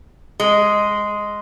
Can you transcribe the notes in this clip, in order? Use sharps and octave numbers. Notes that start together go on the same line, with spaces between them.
G#3